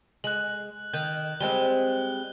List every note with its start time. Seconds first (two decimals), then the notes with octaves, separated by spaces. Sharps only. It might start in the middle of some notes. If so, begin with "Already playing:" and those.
0.24 G#3 F#6 F#7
0.94 D#3 G6
1.41 G3 G#3 C4 G7